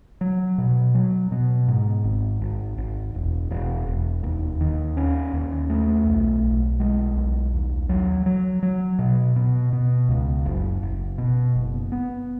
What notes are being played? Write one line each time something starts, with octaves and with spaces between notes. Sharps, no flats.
F#3
B2
F#3
B2
G#2
G#1
G#1
G#1
E1
E1
E1
D#2
D#3
C#4
D#2
A3
B1
B1
G#3
B1
D#2
F#3
F#3
F#3
B2
B2
B2
C#2
F#1
F#1
B2
F#1
B3